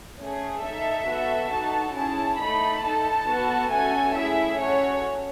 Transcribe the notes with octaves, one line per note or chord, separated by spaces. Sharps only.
A3 C#4 G#4
D#4 A4 E5
B3 F#4 A4
D#4 F#4 A4 A5
C#4 E4 G#4 A5
A3 D#4 A4 B5
D#4 A4 A5
B3 F#4 A4
A3 C#4 F#4 A4 G#5
A3 E4 G#4 E5
C#4 F#4 A4 C#5